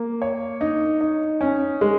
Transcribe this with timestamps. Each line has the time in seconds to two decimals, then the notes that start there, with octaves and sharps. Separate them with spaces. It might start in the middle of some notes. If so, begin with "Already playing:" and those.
Already playing: A#3
0.22 C#5
0.61 D#4
1.01 D#4
1.41 C#4
1.81 G#3